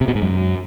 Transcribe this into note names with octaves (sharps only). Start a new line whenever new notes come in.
C3
B2
G#2
F#2